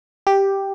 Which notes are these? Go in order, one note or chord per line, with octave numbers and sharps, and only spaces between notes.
G4